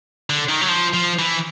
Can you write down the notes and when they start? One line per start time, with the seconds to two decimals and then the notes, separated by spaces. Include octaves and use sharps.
0.30 D3
0.49 D#3
0.61 F#3
0.68 F3
0.94 F3
1.19 E3